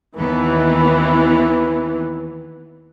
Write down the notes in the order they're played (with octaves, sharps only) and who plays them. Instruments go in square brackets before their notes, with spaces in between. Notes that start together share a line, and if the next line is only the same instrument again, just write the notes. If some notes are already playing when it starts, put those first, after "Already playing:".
[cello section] D#2 D#3 B3 [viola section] E3